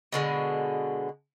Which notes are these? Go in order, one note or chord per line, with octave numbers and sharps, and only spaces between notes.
B2 D3 G#3